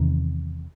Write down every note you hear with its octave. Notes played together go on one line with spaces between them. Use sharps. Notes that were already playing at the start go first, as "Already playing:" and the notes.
Already playing: E2 C3 D#3